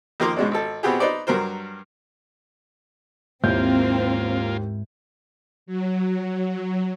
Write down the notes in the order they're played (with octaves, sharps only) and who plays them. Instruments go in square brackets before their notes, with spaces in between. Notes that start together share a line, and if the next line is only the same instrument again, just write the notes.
[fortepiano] F2 D#3 A#3 A#4 C6 D6
G#2 B2 G#3 C#4 D4
G#1 A4
B2 B3 C4 G4 G#4
D#4 B4 C5 D5
G2 F#3 A#4 C5
[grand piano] D#2 G6 [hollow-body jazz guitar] G#2 E4 [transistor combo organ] A#3 F4 [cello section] C4
[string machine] F#3